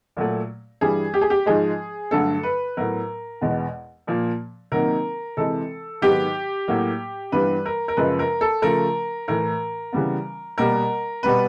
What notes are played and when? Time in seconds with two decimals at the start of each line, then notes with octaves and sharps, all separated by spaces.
0.17 A#2 F#3 A3
0.81 G2 E3 G3 G#4
1.14 G4
1.21 G#4
1.30 G4
1.46 G#2 F3 G#3 G#4
2.11 G2 D3 F#3 A3 A4
2.43 B4
2.77 A2 F#3 B3 A#4
3.41 E2 B2 G#3 B3
4.07 A#2 F3 A#3
4.72 C3 D#3 F#3 A#3 A#4
5.37 C3 E3 G#3 A4
6.02 G#2 D#3 F#3 B3 G4
6.68 A2 F#3 A#3
7.32 G2 E3 G3 B3 B4
7.66 A#4
7.88 A#4
7.97 F#2 C#3 F3 G#3 B4
8.19 A#4
8.41 A4
8.62 C#3 F3 A3 A#4
9.28 A2 E3 A3 A#4
9.93 C#3 E3 G3 B3
10.58 B2 G3 A#3 A#4
11.23 B2 G3 B3 B4